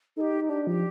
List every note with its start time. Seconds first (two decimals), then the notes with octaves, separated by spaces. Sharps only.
0.16 D#4 A4
0.21 G4
0.41 D#4
0.49 D4 G4
0.67 F3 G4